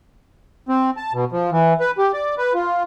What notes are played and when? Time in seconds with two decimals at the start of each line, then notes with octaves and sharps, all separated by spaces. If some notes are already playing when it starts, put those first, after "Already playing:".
0.69 C4
0.97 A5
1.13 B2
1.32 F3
1.52 E3
1.80 B4
1.98 G4
2.13 D5
2.38 B4
2.54 F4